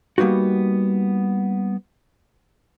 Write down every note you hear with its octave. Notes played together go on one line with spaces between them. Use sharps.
G3 A#3 B3 D#4 F#4